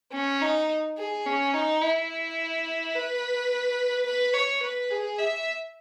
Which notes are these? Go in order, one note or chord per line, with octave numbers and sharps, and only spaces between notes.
C#4
D#4
G#4
C#4
D#4
E4
B4
B4
C#5
B4
G#4
E5